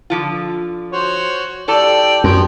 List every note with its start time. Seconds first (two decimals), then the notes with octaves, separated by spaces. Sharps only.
0.10 D3 F3 F4
0.92 F#4 C5 C#5
1.68 A2 G4 A4 D5 A5
2.24 F#2 F3 G4